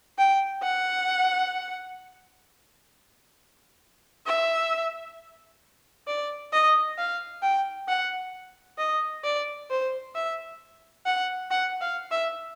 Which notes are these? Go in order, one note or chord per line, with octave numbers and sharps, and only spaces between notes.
G5
F#5
E5
D5
D#5
F5
G5
F#5
D#5
D5
C5
E5
F#5
F#5
F5
E5